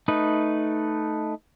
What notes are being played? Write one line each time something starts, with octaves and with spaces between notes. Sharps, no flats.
A3 D#4 B4